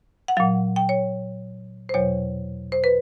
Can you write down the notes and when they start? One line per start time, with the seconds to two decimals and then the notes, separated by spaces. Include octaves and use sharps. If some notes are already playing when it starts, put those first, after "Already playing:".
0.28 F#5
0.37 A#2 F#3 F5
0.76 G5
0.89 C#5
1.89 C5
1.94 E2 B2 F#3 C#5
2.72 C5
2.84 B4